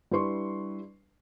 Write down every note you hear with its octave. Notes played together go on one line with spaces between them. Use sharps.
G3 D4 E4 B4 C6 C#6